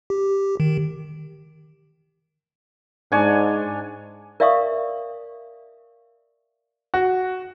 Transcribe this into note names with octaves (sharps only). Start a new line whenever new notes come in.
G4
D#3
G#2 D4 C#5 G#5
A#4 D5 E5 F5 C#6 D#6
F#4